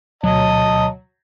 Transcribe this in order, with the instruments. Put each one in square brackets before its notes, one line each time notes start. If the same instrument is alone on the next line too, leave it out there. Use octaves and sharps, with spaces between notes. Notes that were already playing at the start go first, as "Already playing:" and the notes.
[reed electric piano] D2 B2 [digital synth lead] F#3 [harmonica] D#5 [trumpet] A5